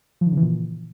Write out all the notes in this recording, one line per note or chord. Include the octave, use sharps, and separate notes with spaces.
F3
D#3
C#3
E3
A#2